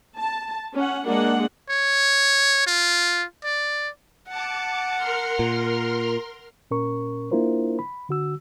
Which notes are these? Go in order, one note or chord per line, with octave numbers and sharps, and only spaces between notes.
A5
C#4 F#5
G#3 A#3 D4 F#5
C#5
F4
D5
F#5 A5 D6
A#4 C6 F6
A#2
A#2 C#4 A#4 C#6
A#3 D4 E4 F4 A#4 C5
B5
D3 F#4 E6